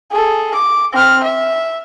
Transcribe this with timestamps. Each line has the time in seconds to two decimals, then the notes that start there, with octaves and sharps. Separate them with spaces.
0.11 G#4 A4
0.54 D6
0.93 C4 F6
1.23 E5